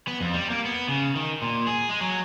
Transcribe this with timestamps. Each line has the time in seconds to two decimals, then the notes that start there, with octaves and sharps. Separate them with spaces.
0.08 B3
0.21 F2
0.34 G3
0.50 A#3
0.65 B3
0.89 C#3
1.16 D#3
1.42 A#2
1.67 G#4
1.89 G#3
2.01 F#3